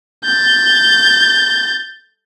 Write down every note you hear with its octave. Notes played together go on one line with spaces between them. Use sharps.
G6 A6